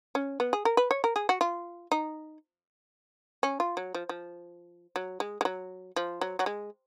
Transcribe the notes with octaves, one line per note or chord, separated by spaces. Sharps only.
C#4
B3
G#4
A#4
B4
C#5
A#4
G#4
F#4
F4
D#4
C#4
F4
F#3
F3
F3
F#3
G#3
G#3
F#3
F3
F#3
F#3
G#3